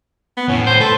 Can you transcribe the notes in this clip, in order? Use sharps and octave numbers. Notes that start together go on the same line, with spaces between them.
B3
A2 C#4
C5
A4 B4